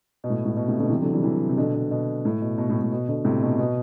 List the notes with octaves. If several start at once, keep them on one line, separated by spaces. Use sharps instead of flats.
B2
A2
A2
B2
A2 C3
B2 D3
C3 E3
D3 F#3
E3 G3
C3 E3
C3
B2 D3
B2
B2
A2
B2
B2
A2
A2
B2
B2 D3
A2 C3
B2
B2